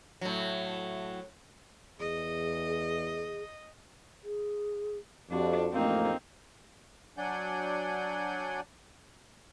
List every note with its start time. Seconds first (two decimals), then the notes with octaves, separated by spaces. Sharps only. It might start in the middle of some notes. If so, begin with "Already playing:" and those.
0.21 A2 F#3
1.99 E2 G#4 D#5
4.24 G#4
5.31 F2 D4 F#4 G4
5.72 A1 F2 A3 A#3 C4 D#4
7.18 F#3 D4 D5 F#5 G#5 G6